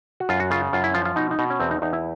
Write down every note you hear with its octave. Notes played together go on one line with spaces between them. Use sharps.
F#4
F#2 F4
F#4
C#3 F4
F#2 F4
E4
F3 F4
F4
B2 D#4
D#4
B2
C#4
E2 C4
D#4
E2 D#4
E4